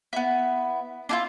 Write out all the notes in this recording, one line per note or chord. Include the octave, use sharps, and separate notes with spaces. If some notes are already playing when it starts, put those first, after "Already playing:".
B3 E4
D4 E4 F4